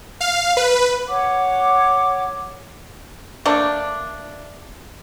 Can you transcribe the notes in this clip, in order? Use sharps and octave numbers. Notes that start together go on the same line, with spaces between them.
F5
B4
C#5 F#5 D6
A3 A#3 D4